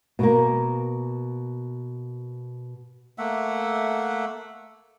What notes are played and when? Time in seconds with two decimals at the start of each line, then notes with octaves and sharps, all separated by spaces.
0.19 B2 A#3
3.18 A3 A#3 E5 F#5